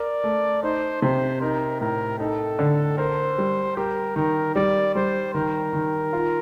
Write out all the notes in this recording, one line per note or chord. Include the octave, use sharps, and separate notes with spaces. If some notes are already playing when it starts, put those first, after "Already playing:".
Already playing: A#4 D5
A3
D#4 C5
C3 C5
D#4 A#4
A2 A#4
D#4 A4
D3
A#4 C5
G3
G4 A#4
D#3 A#4
G3 D5
G3 C5
D#3 A#4
D#3
F4